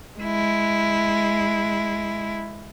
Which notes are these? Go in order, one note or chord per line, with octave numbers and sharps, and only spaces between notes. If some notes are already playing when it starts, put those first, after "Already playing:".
G#3 E4